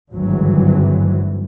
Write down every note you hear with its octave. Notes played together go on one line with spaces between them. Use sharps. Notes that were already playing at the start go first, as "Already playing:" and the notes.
G#1 D2 G2 E3 F#3